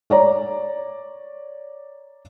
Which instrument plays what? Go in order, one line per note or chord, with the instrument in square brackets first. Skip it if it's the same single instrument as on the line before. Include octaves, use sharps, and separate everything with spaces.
[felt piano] C#5 D5 A#5